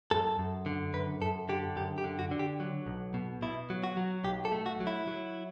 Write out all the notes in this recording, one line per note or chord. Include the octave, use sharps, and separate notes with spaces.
F#2 A4
F#2
D3
F#2 B4
F#2 A4
D3 G4
F#2 G4
G4
D3
F#4
D3
G4
F#3
B1
B2
B2 E4
F#3
F#4
F#3
B1 G4
A4
A3
F#4
F#3
E4
F#3